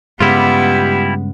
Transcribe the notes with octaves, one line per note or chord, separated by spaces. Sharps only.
G2 C#3 G3 G#3 B3 E4 F4 G4